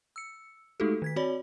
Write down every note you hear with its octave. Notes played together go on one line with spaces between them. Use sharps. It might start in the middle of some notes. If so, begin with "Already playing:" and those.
E6 C#7
G#3 A3 D#4 F#4 G4 A4
D#3 G#6 B6
C4 F#4 C#5 D5 B5